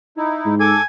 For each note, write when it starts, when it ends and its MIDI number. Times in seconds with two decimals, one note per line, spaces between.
0.17 0.55 63
0.17 0.55 64
0.46 0.76 44
0.60 0.82 69
0.60 0.85 80
0.60 0.82 86